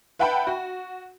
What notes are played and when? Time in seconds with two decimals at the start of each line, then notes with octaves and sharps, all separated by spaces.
0.19 B4 E5 F#5 G5 A5 B5
0.47 F#4